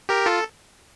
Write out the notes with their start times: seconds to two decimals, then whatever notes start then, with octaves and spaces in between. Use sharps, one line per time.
0.09 G4 A#4
0.26 F4 A4